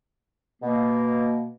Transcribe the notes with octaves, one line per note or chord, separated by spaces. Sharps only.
B2 A#3